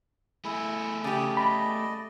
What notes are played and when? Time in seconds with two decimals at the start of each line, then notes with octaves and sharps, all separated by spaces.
0.45 A3 E4 G#4
1.04 C#3 G4 D5 D#6
1.37 D5 D#5 B5